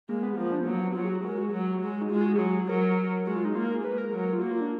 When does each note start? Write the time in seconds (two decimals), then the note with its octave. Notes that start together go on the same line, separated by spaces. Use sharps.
0.09 G#3 A#3
0.23 B3
0.37 F3 A#3
0.52 D4
0.60 B3
0.66 F#3 A#3
0.81 B3
0.95 F#3 F4
1.04 G#4
1.09 F#4
1.24 G#3 A#4
1.38 F#4
1.53 F#3
1.81 G#3
2.01 D#4
2.10 G#3 F4
2.21 F4
2.26 F#4
2.39 F#3 G#4
2.68 F#3 A#4
3.26 G#3 F#4
3.36 F4
3.45 D#4
3.55 A#3 F4
3.64 A#4
3.74 G#4
3.84 G#3 B4
3.98 A#4
4.13 F#3
4.33 F4
4.42 A#3 F#4
4.51 F4
4.61 D4